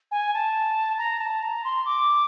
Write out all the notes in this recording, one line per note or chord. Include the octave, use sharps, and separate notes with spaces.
G#5
A5
A#5
A5
A#5
C6
D6